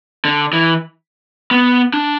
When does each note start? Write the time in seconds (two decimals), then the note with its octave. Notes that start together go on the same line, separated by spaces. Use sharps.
0.25 D3
0.53 E3
1.51 B3
1.94 D4